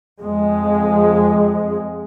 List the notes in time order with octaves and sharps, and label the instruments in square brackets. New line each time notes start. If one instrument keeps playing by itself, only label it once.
[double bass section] F2 G#3